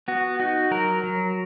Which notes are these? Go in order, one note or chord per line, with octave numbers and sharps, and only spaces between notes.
B3 F#4
D#4 F#4
F#3 A#4
F#3